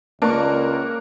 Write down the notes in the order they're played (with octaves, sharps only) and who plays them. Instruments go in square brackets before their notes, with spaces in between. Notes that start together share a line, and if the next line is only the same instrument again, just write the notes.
[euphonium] C#2 [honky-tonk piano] A#3 [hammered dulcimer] D4 C#6